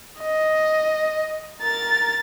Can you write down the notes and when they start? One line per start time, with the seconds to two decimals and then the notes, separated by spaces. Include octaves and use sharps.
0.21 D#5
1.62 A#4 A6